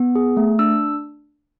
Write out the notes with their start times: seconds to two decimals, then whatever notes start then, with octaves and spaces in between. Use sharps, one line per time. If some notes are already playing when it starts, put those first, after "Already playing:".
Already playing: B3
0.15 G#4
0.37 A3
0.59 D4 E6